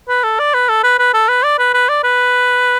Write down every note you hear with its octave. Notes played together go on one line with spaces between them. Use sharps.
B4
A4
D5
B4
A4
B4
B4
A4
B4
D5
B4
B4
D5
B4